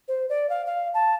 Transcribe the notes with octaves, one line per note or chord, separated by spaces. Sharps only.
C5
D5
F5
F5
A5